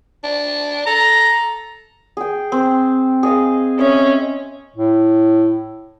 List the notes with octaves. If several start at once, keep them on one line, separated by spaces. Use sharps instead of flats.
D4
A4 A#5
G#4 G5
C4
G#4 D#5 F5
C#4 D#5 E5
A2